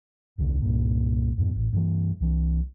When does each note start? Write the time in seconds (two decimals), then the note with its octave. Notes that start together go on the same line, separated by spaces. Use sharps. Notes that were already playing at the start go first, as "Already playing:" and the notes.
0.38 D#1 C2 D3
0.62 C2 G2 A#2
1.38 F2 G#2 B2
1.56 A1
1.73 G2 D3 E3
2.20 C2 E3